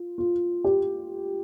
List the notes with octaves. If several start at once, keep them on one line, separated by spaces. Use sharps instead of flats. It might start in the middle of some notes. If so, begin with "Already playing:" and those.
Already playing: F4
F4
G4